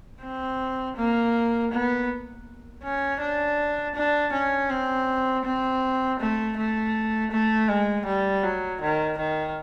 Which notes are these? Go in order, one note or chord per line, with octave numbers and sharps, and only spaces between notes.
C4
A#3
B3
C#4
D4
D4
C#4
C4
C4
A3
A3
A3
G#3
G3
F#3
D#3
D#3